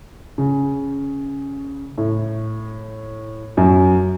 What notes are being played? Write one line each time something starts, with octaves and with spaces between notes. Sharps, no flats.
C#3
A2
F#2